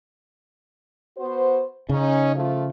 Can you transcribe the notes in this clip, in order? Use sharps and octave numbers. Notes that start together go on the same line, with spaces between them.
B3 F#4 C5
C#3 C#4 D#4
F3 A3 F4